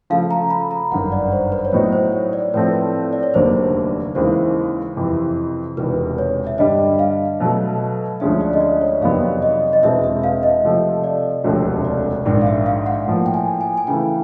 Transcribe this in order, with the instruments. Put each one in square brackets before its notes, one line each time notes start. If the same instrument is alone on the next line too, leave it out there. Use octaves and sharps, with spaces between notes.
[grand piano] C#3 F3 A3 [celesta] F5
[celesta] A#5
B5
A#5
[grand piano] G1 F#2 D#3 [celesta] F#5
[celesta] D5
C5
B4
C#5
[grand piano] A2 F#3 B3 D#4 F#4 [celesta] C5
[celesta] C5
C#5
D5
[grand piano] A2 F3 A3 C4 [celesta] B4
[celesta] D5
C#5
[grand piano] F1 D#2 D3 F#3 A#3 [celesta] C5
[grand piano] D#2 C#3 E3 G#3 [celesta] C5
[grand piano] F2 C3 E3
[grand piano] E1 E2 C3 D#3 [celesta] B4
[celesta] C#5
E5
[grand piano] G2 D3 G3 [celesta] D#5
[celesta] F5
[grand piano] B2 F#3 A3
[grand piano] D2 D3 F3 G#3 C#4 [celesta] E5
[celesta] D5
D#5
D5
C#5
[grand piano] F2 C3 D#3 F#3 B3 [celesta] F5
[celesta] D#5
D#5
[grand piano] E1 E2 B2 G#3 C4 [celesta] E5
[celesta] E5
F5
D#5
[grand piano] C3 F3 A3
[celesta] D5
[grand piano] E1 D2 C3 F3 A3 [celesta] C#5
[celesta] D5
[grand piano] A#1 G#2 D#3 [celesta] D5
[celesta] F5
E5
F5
F#5
[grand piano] A2 F3 A#3
[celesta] G5
G#5
G#5
G#5
[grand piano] C#3 E3 A3 [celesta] G5